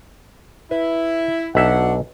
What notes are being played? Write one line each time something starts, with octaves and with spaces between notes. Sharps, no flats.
E4 B4
B1 D4 F#4 E5 F#5